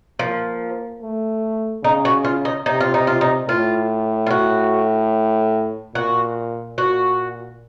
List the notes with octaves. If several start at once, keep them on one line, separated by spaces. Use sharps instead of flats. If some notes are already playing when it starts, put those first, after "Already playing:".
F3 A#3
A3
C#3 D#4
F#4
F4
D#4
C3 D#4
F4
D#4
F4
D#4
A2 F4
F4
F#4
A#2 F#4
A#2 F#4